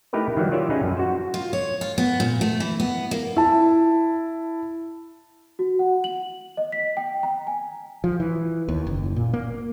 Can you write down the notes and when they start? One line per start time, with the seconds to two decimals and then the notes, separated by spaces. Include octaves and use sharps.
0.13 A3 D#4 E4 G4 A#4 B4
0.37 D#3 E3 F#3 G3
0.52 F4 G4 C#5 D5 E5
0.70 C#4 D#4 G#4 B4 C#5
0.83 F#2
0.97 F#4 C5
1.34 F4
1.53 C#5
1.81 F4
1.98 B3
2.20 A#2
2.41 A3
2.60 E3
2.80 B3
3.11 A#3
3.37 E4 A5
5.59 F#4
5.79 F#5
6.04 F#7
6.57 D#5
6.72 B6
6.97 G5
7.23 A#5
7.47 G#5
8.04 F3
8.20 E3
8.68 D#2
8.87 F#1
9.16 A#2
9.33 A#3